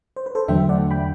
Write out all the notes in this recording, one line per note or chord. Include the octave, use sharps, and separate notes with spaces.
C5
B4
A4 C5
E2 D3 F#3 A3 D4 E5 G5
D5 F#5
G5 B5